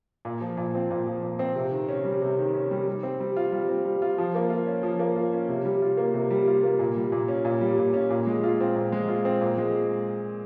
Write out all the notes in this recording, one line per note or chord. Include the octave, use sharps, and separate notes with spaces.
A#2
F3
A#2
C4
A#2
F3
A#2
C4
C3
D#3
C#4
G3
C3
D#3
C#4
G3
G3
C4
G3
F4
G3
C4
G3
F4
F3
A#3
F4
C#4
F3
A#3
F4
C#4
C3
G3
F4
A#3
C3
G3
F4
A#3
A#2
G3
A#2
C#4
A#2
G3
A#2
C#4
A#2
G#3
F4
C4
A#2
G#3
F4
C4
A#2
G#3